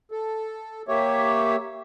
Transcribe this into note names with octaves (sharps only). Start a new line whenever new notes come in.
A4
A#3 G4 C#5 E5